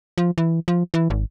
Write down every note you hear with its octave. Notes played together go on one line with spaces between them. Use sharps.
F3
E3
F3
E3
G#1